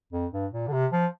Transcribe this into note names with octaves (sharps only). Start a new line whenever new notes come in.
F2
G2
A#2
D3
C3
F3